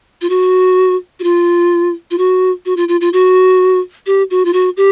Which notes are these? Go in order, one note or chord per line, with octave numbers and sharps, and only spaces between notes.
F4
F#4
F#4
F4
F4
F#4
F#4
F4
F4
F4
F#4
G4
F#4
F4
F#4
G4